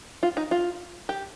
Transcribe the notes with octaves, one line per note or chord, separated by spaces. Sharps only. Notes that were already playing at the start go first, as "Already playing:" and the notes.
F4
D#4
F4
G4